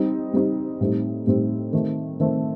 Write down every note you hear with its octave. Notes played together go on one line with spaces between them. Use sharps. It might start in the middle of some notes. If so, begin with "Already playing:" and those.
Already playing: G3 C4 D#4
G3 C4 D#4
A2 G3 C4 D#4
A2 G3 C4 D#4
D#3 A3 C4
D#3 A3 C4